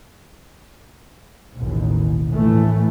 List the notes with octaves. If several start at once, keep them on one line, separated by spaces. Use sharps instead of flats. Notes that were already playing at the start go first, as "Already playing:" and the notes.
A1 D#2 B2
A#1 A2 E3 A3